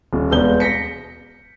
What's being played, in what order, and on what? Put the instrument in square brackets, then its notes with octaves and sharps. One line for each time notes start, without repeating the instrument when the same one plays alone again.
[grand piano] D#1
E1 B3 G6 G7
A#6 B6 C#7